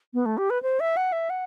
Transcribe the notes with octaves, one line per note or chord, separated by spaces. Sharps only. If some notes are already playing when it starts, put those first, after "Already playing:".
B3
A3
G4
B4
C5
E5
F#5
E5
F#5